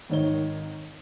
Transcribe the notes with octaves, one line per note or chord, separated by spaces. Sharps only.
G#1 D#3 C#5 G7